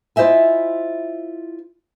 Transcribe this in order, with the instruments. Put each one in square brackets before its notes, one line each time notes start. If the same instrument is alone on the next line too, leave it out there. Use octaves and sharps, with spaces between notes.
[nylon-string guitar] E4 F4 C5 D#5 E5 G#5